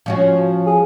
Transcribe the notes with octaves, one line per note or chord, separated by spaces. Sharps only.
F3 C#4 F#4
G#4